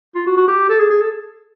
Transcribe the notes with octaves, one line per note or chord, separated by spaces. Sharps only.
F4
F#4
F#4
G4
A4
G#4
G#4
A4